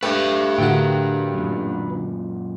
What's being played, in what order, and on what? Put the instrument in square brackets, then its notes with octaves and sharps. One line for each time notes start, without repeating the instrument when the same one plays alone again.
[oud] A3 G4 [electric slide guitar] D4 B4
[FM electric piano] A2 D3 F#4 [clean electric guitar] A#4 G5
[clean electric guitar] F#2 A#2